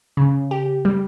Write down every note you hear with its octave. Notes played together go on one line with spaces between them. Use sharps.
C#3
G4
G3